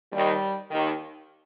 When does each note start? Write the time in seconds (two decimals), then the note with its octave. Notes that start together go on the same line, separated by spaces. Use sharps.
0.12 D#2 D#3 G3
0.70 D#2 D#3